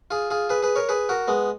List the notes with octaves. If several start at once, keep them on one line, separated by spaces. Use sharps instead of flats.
F4 G#4
F4 G#4
G#4 B4
G#4 B4
A#4 C#5
G#4 B4
F#4 A#4
G#3 B3